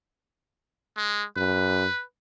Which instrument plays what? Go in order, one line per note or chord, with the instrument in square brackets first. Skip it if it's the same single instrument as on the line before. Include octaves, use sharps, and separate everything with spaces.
[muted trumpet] G#3
[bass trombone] F#2 [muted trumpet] B4